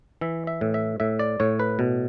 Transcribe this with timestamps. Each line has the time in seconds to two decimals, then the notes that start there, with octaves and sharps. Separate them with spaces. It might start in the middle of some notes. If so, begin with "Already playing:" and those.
0.21 E3 E5
0.47 E5
0.61 A2
0.74 E5
1.00 A2 E5
1.19 D5
1.40 A2 C#5
1.60 B4
1.79 B2